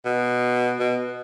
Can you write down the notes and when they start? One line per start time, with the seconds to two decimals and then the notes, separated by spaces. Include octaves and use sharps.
0.05 B2
0.79 B2